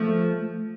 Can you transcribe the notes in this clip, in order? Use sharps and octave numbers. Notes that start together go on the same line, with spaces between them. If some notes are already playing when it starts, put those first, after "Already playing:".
Already playing: F3 A3